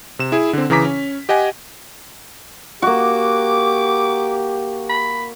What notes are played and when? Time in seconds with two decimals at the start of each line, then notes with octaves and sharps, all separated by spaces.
0.19 C3 E7
0.32 E4 G#4
0.53 D3 C4
0.70 C#3 E3 G#4 A#5 D6 B6
0.85 C#4
1.29 G4 D#5 F#5 G#5
2.82 A#3 F#4 G4 D6
4.89 B5